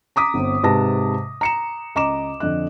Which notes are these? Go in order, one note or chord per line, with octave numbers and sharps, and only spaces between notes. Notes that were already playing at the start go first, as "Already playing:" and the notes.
A#5 D6 D#6 B6
G1 C4
G#2 C3 B4 A5 A#6
A#5 C#7 E7
C#2 D#5 A#5 D6 E7
F2 D3 D#5 F#6